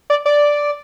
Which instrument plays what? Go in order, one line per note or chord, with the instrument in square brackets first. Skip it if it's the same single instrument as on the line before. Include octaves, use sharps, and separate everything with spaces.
[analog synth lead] D5
D5